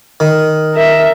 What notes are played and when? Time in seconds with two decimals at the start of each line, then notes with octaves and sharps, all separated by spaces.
0.20 D#3
0.74 A#4 E5